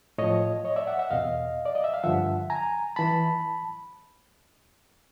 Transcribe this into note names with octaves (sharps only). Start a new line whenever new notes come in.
A2 F3 C#5 D#5
C#5 D#5
D5 E5
E5 F#5
E5 F#5
E2 B2 D#5 F5
D5
D#5
E5
F5
G2 D3 F3 E5 F#5
G#5 A#5
E3 A5 B5